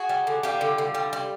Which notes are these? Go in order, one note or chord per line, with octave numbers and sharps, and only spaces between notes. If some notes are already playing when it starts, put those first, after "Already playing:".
Already playing: F#4 G#4
G3
D3
G3 F4 G4
D3
D3
G3
G3